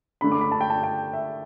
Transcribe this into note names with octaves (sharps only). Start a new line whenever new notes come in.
D3 A3 D4 B5
D6
B5
A5
G5
A5
G5
E5